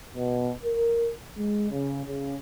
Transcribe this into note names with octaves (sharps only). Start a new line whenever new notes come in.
B2
A#4
G#3
C#3
C#3